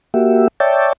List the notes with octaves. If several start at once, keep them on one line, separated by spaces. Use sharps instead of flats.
A#3 F#4 G4 E5
C#5 D5 E5 G5 A5